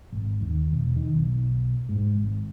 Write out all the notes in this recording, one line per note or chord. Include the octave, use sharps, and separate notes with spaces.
G#1
D#2
E1
D#3
B1
G#2
G#1